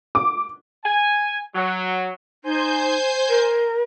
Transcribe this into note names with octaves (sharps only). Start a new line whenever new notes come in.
D6
G#5
F#3
D#4 C5 G#5 G6
A#4